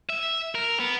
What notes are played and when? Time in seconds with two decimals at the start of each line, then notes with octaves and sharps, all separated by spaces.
0.09 E5
0.55 A#4
0.80 B3